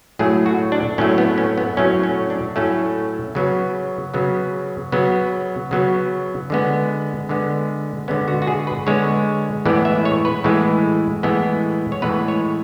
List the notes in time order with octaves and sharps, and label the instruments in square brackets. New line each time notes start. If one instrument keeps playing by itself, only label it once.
[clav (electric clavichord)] A2 F#3 A3 G#4
F#4
D4
A2 F#3 A3 C#4
B3
C#4
B3
A2 F#3 A3 C#4
C#4
D4
A2 F#3 A3 C#4
C#3 F#3 B3
C#3 F#3 B3
C#3 F#3 B3
C#3 F#3 B3
D3 G#3 B3
D3 G#3 B3
D3 G#3 B3 C#4
F#4
F#4
G#4
B4
D3 G#3 B3 C#5
A2 E3 G#3 B3 D5
E5
C#5
B4
A2 E3 G#3 B3
A2 E3 G#3 B3
C#5
A2 E3 G#3 B3 B4
C#5